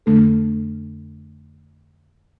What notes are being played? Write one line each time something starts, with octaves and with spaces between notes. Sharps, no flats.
F2 D3 A3 D4 A4